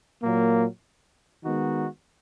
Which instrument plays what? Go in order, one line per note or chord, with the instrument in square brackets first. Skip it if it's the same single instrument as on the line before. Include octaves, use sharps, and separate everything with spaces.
[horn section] A#2 F#3 A#3
D#3 G#3 B3 D#4 F#4